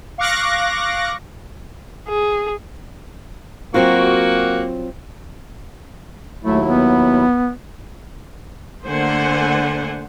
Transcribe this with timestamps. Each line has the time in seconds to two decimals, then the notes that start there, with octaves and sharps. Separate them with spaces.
0.18 F5 C#6 D6 F#6 A#6
2.08 G#4
3.74 F#3 A#3 C4 F4 F#4
6.44 D#2 F#3 A3 E4
6.65 B3
8.87 D3 A3 A#3 C5 F#5 G#5